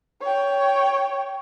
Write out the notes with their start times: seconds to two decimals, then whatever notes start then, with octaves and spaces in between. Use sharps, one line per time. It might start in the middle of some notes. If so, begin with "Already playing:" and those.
0.22 C#5 G5